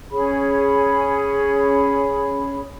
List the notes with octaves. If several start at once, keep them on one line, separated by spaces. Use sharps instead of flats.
C#4 G#4 C#5 B5